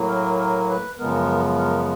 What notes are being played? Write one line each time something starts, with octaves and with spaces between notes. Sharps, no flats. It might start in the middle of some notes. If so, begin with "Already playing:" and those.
Already playing: A2 F#3 A#3
A#4
A#4
B4
F#2 C#3 F3 G#3 B3 A#4
A#4